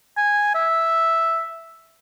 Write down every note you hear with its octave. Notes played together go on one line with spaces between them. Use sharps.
G#5
E5